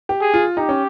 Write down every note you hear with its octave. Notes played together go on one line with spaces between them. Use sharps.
G4
G#4
F4
D#4 G4
C#4